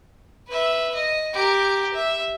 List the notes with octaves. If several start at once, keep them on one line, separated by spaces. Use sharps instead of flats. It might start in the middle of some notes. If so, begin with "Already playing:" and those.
B4 E5
D#5
G4 A#4
E5